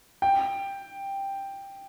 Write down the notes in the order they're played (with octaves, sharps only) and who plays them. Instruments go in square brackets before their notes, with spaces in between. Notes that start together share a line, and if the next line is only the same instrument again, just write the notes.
[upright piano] G5